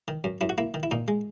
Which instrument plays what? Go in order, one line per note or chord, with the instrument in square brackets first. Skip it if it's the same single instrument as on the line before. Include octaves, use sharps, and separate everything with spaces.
[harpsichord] D#3
F#2
F#2 E4
F#4
A#3 E4
D#3
E4
A#2 D#4
G#3